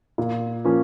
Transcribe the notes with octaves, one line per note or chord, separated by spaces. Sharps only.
A#2
F3 A#3 C#4